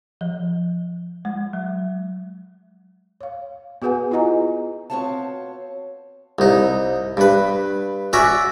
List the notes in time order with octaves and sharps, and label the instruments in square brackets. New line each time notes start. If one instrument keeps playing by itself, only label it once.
[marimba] F3
G#3
F#3
[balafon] C#5 F5
B3 F#4 G#4 B4 F#5 G#5
E4 F4 G#4 D#5 G#5 A#5
[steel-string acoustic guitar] B3 C4 F#4 C#5 F5 A5
[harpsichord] C2 D#4
G2 B4
C#4 F#4 D5 E5 A#5